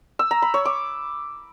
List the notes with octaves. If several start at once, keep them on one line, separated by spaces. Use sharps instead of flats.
E6
A#5
B5
C#5
D6